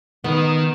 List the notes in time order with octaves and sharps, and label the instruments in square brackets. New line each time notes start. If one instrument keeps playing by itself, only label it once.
[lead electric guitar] D#3 [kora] B3